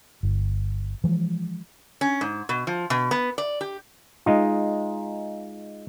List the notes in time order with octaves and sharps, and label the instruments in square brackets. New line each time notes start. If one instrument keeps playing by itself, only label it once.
[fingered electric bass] G1
E3 F3 G#3
[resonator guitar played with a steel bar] C#4
G#2
B2
F3
B2
B3
D5
G4
[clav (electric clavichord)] G#3 D#4 F4